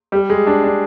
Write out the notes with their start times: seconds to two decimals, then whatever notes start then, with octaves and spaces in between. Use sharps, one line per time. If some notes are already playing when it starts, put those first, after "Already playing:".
0.12 G3
0.30 G#3
0.47 D4
0.64 D4